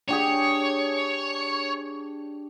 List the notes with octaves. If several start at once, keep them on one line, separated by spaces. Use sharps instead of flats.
D4 G4 G#4 C#5